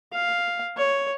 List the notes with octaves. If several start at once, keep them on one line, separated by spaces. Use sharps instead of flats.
F5
C#5